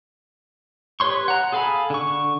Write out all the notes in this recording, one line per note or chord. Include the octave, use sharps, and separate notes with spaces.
G4 B4 C#5 C6 C#6
F#5 A#5
G#4 A4 F5 G#5 B5
D3 C#6